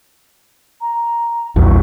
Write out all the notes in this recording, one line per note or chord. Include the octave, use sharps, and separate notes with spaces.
A#5
A#1 E2 G2 F#4